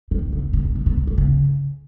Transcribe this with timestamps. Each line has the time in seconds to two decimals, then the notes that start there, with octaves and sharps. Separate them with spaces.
0.11 D#3
0.33 C#3
0.53 C3
0.65 B2
0.75 B2
0.86 C3
0.97 B2
1.07 C3
1.18 C#3